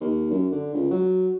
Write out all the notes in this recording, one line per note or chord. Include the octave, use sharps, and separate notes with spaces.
D#2
F#2
D3
C#2
F#3